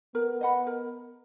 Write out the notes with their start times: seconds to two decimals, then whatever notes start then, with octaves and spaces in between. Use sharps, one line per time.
0.15 B3 A#4
0.41 D#5 F#5 B5
0.67 A#4